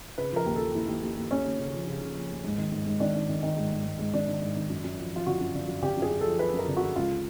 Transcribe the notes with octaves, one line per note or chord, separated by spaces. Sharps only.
C#3 B4
F3 A#4
D#2
F3 A4
D#2 E4
D#2
D#2
D#2
D#2 C#4
D#2
C#3
F3
C#3
C#3
F3
D#2
G#2
D#3
G#2
G#2
D#3 D4
D#3
D#3
D#3
G#2
G#2
G#2
G#2
D#3 D4
D#3
G#2
D#3
F#2
F#2
F3
F3 F4
D3 F#4
F#2
D3
F#2
D3 G4
F#2
G#4
F#2
F3 A4
F3 B4
F#2
A#4
D3
F#2 F#4
C#2 F4